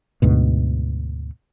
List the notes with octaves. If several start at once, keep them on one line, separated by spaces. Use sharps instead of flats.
D2 G#2 B2